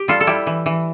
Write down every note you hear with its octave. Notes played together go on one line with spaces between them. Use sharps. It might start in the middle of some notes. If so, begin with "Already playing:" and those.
Already playing: G4
G3 F4 A4
A4
G3 E4 G4
E3
E3